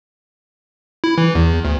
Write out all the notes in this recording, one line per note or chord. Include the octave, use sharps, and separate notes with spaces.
E4
E3
E2
D2